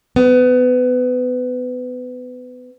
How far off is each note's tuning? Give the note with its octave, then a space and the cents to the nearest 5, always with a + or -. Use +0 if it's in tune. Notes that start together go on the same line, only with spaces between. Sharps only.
B3 +25